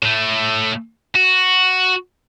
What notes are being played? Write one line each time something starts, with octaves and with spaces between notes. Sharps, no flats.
A2 A3
F#4